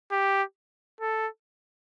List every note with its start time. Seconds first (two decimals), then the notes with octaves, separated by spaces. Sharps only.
0.12 G4
1.01 A4